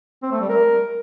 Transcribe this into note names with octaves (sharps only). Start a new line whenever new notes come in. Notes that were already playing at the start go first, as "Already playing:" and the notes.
C4
A3
G3
A#4